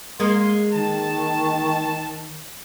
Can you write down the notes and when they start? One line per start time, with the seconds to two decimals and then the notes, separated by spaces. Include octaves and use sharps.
0.20 G#3 A#3 F5 C6
0.74 D#3 A5